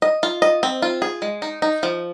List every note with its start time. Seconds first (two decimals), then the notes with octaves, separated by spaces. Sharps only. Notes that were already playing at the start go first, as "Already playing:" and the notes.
0.02 D#5
0.23 F4
0.42 D#5
0.63 C4
0.82 F4
1.02 G#4
1.22 G#3
1.42 D#4
1.62 D#4
1.83 F3